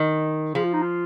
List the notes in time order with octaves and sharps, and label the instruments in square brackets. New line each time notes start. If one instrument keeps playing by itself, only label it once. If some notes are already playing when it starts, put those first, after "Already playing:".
Already playing: [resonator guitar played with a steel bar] D#3
[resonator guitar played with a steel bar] F3 [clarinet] G#4
[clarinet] F4
D#4
F4